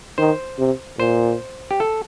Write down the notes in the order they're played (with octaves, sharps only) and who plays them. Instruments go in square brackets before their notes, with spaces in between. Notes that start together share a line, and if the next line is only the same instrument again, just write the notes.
[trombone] D#3 [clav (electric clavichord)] C5
[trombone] C3
[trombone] A#2 [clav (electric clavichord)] C5
[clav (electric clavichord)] G4
A4